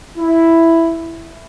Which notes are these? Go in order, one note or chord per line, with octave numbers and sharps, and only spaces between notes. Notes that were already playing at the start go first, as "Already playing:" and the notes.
E4